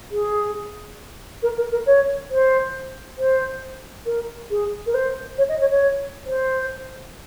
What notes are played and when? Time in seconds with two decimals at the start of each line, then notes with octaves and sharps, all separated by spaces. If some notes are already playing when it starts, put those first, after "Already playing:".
0.11 G#4
1.42 A#4
1.57 A#4
1.71 A#4
1.86 C#5
2.30 C5
3.18 C5
4.06 A#4
4.50 G#4
4.86 A#4
4.94 C5
5.38 C#5
5.49 D#5
5.61 C#5
5.71 C#5
6.26 C5